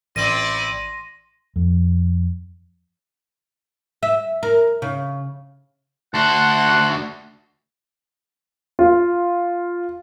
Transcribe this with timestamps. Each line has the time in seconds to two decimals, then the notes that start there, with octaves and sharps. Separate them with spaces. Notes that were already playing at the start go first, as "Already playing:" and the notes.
0.16 A1 C4 E4 D5 C6 A#6 D#7
1.56 F2
4.03 E5
4.43 A#4
4.82 C#3
6.14 D2 F#4 F#5 A5 C6 F#6
8.79 F4